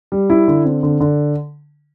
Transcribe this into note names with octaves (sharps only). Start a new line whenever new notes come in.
G3
E4
D3
C4
D3
D3